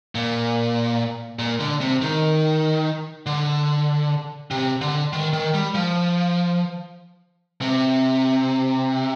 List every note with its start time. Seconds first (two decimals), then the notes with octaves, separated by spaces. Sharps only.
0.15 A#2
1.39 A#2
1.60 D3
1.81 C3
2.02 D#3
3.26 D3
4.51 C3
4.81 D3
5.13 D#3
5.33 D#3
5.54 G3
5.75 F3
7.61 C3